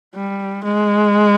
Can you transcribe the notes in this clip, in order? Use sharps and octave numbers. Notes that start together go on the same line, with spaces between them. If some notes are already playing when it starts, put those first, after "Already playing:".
G3
G#3